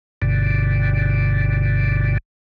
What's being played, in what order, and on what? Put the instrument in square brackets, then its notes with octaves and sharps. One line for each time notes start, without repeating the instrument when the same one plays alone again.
[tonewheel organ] G1 G2 B2 D3